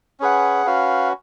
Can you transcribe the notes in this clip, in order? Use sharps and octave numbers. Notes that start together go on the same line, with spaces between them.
C#4 G#4 B4 F#5
C#4 F#4 B4 F5